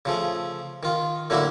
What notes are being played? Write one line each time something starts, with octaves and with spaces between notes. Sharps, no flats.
C#3 F3 A3
D#3 F4
A2 D3 F#3 A#3 E4 F#4